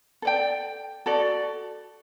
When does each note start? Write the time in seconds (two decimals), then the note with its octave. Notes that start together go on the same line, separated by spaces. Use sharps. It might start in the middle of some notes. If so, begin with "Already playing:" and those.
0.22 A4 D5 G5
1.06 F#4 A4 D5